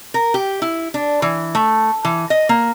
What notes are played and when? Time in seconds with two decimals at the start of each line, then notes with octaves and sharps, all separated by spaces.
0.14 A#4
0.34 G4
0.62 E4
0.94 D4
1.22 E3
1.55 A3
2.05 E3
2.30 D#5
2.49 A#3